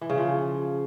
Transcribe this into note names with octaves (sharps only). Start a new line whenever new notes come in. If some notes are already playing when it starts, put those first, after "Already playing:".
E3
C#3
F3